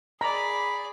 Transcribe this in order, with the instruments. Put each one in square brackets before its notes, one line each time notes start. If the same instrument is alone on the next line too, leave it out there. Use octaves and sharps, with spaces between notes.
[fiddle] G#4 D5 [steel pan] A#5 [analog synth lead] B5